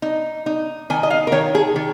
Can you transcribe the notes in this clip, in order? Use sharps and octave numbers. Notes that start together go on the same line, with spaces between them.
D#4
D#4
D#3 G#5
D#5
F5
A#4
D#3 C#5
G#4
D#3